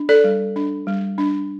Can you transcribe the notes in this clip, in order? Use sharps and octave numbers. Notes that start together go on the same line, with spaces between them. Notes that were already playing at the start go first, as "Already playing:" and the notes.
Already playing: D4
A4 D5
G3
D4
G3
D4